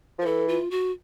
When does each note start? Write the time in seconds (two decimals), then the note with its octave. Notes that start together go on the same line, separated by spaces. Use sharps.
0.19 F3
0.22 A#4
0.26 E3 A4
0.49 F4
0.71 F#4